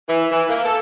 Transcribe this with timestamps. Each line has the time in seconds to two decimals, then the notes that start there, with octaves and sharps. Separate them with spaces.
0.09 E3
0.32 E3
0.50 A#3
0.65 A4